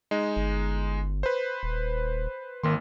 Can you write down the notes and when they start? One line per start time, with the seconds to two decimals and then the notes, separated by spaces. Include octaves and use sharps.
0.11 G#3 D#4
0.37 G1
1.23 B4 C5
1.63 D#1
2.63 G#1 D#3 A#3 C6